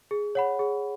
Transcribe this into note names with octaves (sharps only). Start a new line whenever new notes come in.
G#4
C#5 F#5 B5
G#4